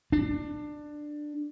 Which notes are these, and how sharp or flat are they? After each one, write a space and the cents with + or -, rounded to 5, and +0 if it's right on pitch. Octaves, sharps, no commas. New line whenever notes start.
D4 +15